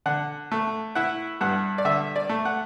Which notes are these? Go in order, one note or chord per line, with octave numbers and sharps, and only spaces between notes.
D3 F#5
A3
E4 F#5
G2 F#5
D5
D3 E5
D5
A3
F#5